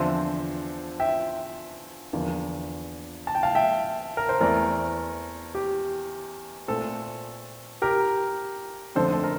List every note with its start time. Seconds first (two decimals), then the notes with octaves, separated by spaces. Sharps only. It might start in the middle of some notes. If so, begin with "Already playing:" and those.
Already playing: E2 D3 F3 C4 C5 E5
1.00 E5 G5
2.13 E2 D3 F3 A#3
3.27 A5
3.35 G5
3.43 F5 A5
3.55 E5 G5
4.17 A#4
4.29 C5
4.40 E2 E3 A3 C4 A#4 D5
5.55 G4
6.68 A#2 A3 C4 A4
7.82 G4 A#4
8.95 F2 D3 A3 C4 A4 C5
9.13 A4
9.23 A#4